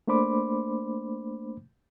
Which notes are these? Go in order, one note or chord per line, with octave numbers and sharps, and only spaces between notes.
A3 A#3 D4 C5 B5 D6